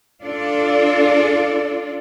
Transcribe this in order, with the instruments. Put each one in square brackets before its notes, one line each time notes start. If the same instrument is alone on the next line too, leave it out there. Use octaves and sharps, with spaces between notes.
[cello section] D4 F4 A4 D5